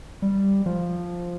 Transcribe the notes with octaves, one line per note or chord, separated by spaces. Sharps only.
G3
F3